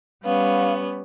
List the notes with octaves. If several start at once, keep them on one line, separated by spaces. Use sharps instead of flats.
G3 B3 C#4 F5